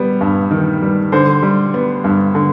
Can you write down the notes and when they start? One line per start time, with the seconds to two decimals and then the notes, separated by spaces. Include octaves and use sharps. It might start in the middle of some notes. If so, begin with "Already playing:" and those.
Already playing: G3 B3
0.21 G2
0.51 D#3
0.82 G3
1.12 D3 C5
1.43 G3
1.74 B3
2.04 G2
2.35 D3